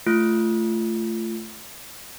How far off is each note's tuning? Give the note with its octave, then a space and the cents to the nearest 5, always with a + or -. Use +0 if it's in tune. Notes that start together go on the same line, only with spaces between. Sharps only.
A3 +0 F4 -25